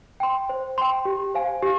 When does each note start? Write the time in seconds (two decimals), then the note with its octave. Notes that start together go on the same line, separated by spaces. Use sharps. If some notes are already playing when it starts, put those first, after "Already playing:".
0.20 G5 C6
0.49 C5
0.78 G5 C6
1.05 G4
1.34 C5 F5 G#5
1.63 G4